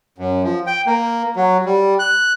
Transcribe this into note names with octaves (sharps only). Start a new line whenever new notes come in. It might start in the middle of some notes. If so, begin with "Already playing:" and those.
F#2
F3
G5
A#3
F#3
G3
F#6